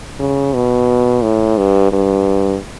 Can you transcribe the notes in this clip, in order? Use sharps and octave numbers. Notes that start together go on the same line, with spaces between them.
C#3
B2
A2
G2
G2